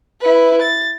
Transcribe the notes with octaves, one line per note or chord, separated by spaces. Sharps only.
E4 B4
A6